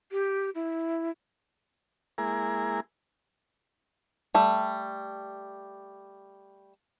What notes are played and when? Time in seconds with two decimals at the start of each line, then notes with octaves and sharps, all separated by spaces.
0.12 G4
0.55 E4
2.18 G#3 A#3 E4 G#4 A#4
4.34 G3 A3